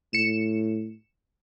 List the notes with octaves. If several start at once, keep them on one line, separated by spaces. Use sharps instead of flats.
A2 C#7 E7